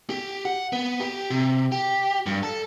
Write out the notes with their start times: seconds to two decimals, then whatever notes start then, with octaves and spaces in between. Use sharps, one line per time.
0.10 G4
0.45 F#5
0.73 B3
1.00 G4
1.30 C3
1.72 G4
2.26 G2
2.43 A4